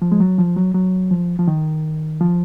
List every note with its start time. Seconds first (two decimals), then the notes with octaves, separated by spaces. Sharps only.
0.02 F3
0.12 G#3
0.20 F#3
0.38 F3
0.56 F#3
0.74 F#3
1.11 F3
1.39 F3
1.48 D#3
2.21 F3